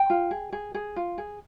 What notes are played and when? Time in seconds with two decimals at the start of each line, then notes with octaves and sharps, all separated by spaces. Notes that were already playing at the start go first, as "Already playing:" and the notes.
Already playing: G5
0.10 F4
0.31 G#4
0.53 G#4
0.74 G#4
0.96 F4
1.18 G#4